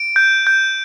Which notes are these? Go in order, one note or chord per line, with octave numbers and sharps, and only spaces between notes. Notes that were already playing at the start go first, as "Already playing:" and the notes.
Already playing: D7
G6
G6